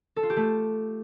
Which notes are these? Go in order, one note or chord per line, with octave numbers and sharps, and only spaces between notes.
A4
F4
G4
A3